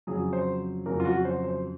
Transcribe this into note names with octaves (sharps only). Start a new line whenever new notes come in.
F2 C#3 F#3 G#4
C5
F2 C#3 F#3 A#4
F4
F#4
C5
C5